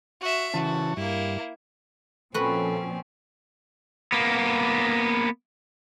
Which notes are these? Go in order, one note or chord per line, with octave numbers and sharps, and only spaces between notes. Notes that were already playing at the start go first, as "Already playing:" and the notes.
F#4 E5
C#3 E3 F#4 A5
G2 A#3 E4
A#2 F3 C4 C#4 F#4 A4 B4
A#3 B3